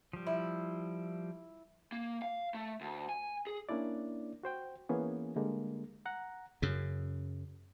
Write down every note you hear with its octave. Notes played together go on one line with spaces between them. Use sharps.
F3 G3
E4
A#3
F5
A3
D2
G#5
G#4
A#3 C#4 D4 E4 D5
F#4 C5 G5
E3 A#3 B3 C#4 G#4
D3 G3 G#3 A#3
F#5 A#5
F#2 C#3